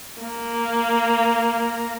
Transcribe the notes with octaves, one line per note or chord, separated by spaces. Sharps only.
A#3